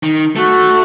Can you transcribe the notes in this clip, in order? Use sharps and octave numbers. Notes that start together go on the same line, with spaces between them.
D#3
A3 F#4